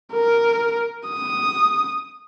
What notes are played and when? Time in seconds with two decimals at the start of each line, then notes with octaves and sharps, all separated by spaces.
0.13 A#4
1.09 D#6